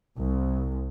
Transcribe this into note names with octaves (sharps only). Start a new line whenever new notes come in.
C2